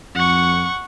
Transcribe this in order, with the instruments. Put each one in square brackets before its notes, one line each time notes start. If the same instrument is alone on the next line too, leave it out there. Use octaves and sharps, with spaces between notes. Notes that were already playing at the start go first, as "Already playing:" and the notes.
[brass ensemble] F2 [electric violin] F#5 C#6